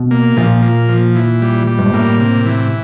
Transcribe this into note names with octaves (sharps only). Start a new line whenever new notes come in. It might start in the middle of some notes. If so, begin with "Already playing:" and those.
Already playing: B2
A#3
A#2 F3
A#3
F3
E3
G3
G3
G2
G#2
A2 A#3
C3
E3